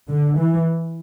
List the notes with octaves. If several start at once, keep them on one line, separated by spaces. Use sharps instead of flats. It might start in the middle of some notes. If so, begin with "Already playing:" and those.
D3
E3